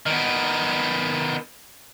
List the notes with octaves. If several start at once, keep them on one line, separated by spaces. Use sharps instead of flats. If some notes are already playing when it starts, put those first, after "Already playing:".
D#3 B3